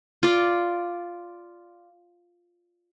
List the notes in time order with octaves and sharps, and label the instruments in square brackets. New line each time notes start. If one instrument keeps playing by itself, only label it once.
[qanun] F4 D5